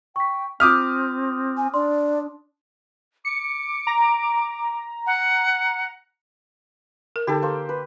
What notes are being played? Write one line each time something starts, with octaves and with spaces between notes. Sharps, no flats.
G5 C#6 B6
C4 F4 D6 D#6 F6 G6 B6
G#5
D4 D5 C6
D6 C#7
A#5
F#5
A#4
D3 D#4 G4 A4
A#3 C5
B4